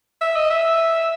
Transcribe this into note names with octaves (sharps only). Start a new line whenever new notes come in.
E5
D#5
E5